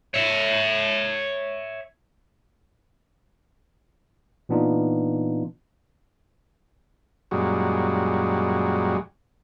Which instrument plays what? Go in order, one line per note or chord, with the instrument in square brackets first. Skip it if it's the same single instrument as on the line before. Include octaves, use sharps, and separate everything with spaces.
[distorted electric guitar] C#5 E5
[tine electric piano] A#2 E3 B3 D4 D#4 F4
[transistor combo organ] F#2 A#2 G3 G#3 F#4